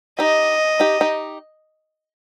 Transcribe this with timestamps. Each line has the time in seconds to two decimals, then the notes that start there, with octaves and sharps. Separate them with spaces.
0.19 D#4 G4 D#5
0.80 D#4 G4
1.01 D#4 G4